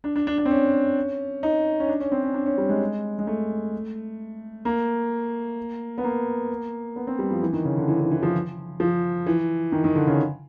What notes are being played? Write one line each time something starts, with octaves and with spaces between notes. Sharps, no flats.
D4
D4
D4
D4
C4
C#4
D#4
C#4
D4
C#4
C4
C#4
D4
C#4
G3
G#3
G#3
A3
A#3
B3
A#3
B3
C4
G3
F3
E3
D#3
C#3
D3
E3
E3
E3
F3
F3
E3
D#3
D#3
D3
C#3